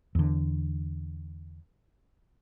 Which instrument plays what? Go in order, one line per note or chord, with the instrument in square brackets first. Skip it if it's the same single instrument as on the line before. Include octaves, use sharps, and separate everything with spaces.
[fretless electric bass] E2 D3